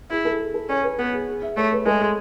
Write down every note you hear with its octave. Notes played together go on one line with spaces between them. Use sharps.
E4 G#4
A4
G#4
A4
C#4 C#5
B4
B3 B4
G#4
G#4
E5
A3 C#5
B4
G#3 A4
G#4